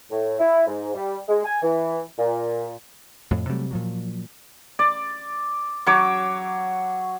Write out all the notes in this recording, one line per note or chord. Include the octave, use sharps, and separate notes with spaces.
A2
E4
G#2
G3
G#3
G#5
E3
A#2
F2 A2
C3 F#3 G3 A3
A#2 F3 F#3
D5
F#3 C#5 D6